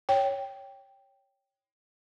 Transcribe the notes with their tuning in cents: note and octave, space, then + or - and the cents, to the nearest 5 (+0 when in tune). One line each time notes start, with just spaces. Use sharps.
C#5 +0 G5 +0